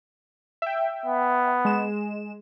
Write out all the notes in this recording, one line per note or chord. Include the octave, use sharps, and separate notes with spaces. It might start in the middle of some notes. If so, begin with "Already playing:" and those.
E5 G5
B3
G#3 E7